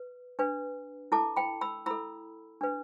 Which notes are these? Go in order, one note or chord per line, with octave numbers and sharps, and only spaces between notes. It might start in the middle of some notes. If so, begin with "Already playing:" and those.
Already playing: B4
D4 B4
E4 A4 A5 D6
G5 B5
B5 E6
E4 A4 B5 E6
D4 B4